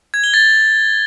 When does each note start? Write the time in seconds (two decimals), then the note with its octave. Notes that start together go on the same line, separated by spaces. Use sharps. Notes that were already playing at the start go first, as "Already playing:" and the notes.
0.14 G#6
0.24 G7
0.34 A6